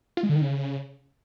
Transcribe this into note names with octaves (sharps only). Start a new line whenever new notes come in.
F4
G#3
D3
D#3
C#3